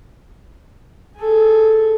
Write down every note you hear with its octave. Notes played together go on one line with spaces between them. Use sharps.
G#4 A4